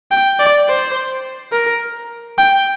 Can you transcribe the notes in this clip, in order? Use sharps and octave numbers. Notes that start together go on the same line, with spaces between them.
G5
D5
C5
A#4
G5